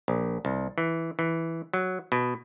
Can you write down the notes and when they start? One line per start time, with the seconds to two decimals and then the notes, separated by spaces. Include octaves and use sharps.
0.08 A#1
0.45 C2
0.78 E3
1.19 E3
1.74 F#3
2.12 B2